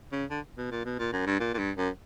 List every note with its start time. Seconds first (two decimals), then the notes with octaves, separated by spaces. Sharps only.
0.12 C#3
0.30 D3
0.58 B2
0.71 A#2
0.85 B2
0.99 A#2
1.13 F#2
1.27 G2
1.40 A#2
1.54 A#2
1.59 G2
1.77 F#2